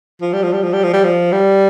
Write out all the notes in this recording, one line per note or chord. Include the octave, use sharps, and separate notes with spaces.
F3
G3
F3
G3
F3
G3
F3
G3
F3
G3